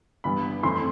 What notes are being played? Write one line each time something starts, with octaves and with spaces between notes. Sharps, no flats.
G2 E3 B3 B5
F2 E3 A3 C4 E4 C6